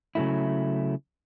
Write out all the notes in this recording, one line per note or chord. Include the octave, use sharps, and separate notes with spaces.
C#3 F#3 A3 E4